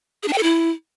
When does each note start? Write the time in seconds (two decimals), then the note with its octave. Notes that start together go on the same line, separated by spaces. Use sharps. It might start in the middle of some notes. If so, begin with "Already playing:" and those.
0.23 G#4
0.28 D4
0.33 G5
0.38 A4
0.43 E4